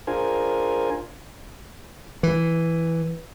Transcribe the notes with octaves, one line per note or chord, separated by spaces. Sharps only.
D4 F4 G#4 A#4 C5 G#5
E3